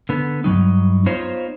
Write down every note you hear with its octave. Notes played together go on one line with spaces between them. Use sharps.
D3 B3
G2 C#3 F#3 D#4
B3 D#4 F4 C5 C#5